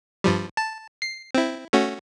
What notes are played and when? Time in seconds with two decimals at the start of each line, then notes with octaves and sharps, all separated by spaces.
0.24 G2 F3 G3
0.57 A5
1.02 C7
1.35 C4 E4
1.73 A3 C#4 F#4